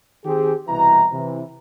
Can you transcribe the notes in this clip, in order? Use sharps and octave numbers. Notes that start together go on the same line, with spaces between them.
D#3 C4 G4 G#4
C2 B2 E3 A#5
C3 E3